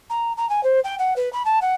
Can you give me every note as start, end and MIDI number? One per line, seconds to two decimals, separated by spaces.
0.10 0.32 82
0.37 0.48 82
0.49 0.63 80
0.63 0.80 72
0.84 0.95 79
0.98 1.14 78
1.16 1.31 71
1.33 1.42 83
1.45 1.59 81
1.61 1.74 78